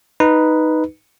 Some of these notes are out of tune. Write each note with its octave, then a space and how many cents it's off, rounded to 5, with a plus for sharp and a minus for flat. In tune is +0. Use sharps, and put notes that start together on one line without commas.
D#4 +0 B4 +0